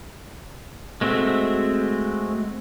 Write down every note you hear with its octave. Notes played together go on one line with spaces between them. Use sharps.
G#3 A3 C4 F#4 E5